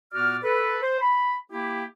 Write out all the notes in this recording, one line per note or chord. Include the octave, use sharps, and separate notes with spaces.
A#2 B3 F#4 D5 F6
A4 B4
C5
B5
A#3 E4 G4